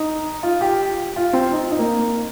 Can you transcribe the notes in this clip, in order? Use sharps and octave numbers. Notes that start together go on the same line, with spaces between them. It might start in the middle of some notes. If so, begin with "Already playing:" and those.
Already playing: D#4
F4
G4
F4
C4
D#4
D#4
A#3